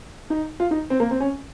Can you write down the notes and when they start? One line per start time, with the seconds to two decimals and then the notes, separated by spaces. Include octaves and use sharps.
0.30 D#4
0.60 F4
0.71 D#4
0.90 C4
1.00 A#3
1.11 C4
1.20 C#4